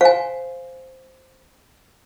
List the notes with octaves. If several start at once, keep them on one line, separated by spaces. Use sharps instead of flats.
C5 F5 G#5